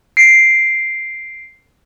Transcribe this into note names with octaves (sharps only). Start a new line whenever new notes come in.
C7 D7